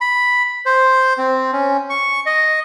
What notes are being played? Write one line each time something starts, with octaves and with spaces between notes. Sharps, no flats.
B5
C5
C4
C#4
C#6
D#5